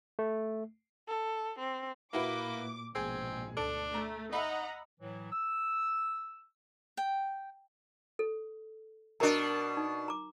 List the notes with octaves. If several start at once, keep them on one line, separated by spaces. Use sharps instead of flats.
A3
A4
C4
A#2 A#3 E4 F#4 B4 D6
A#1 G#2 B2 C4 G#4
D2 D4 A4
A3 A#5
D#4 D#5 E5 F#5 A#5 B5
A2 E3 F#3
E6
G5
A4
B2 D4 F#4 A#4 A#5
D#4
A#5 D6